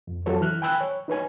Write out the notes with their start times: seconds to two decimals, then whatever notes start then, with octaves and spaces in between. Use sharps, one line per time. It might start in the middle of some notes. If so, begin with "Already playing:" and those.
0.07 F2
0.26 F2 F#3 A4 C#5
0.41 E3 F6 F#6
0.62 G5 G#5 B5 E6 F#6
0.81 C#5
1.08 D#4 B4 C#5 G#5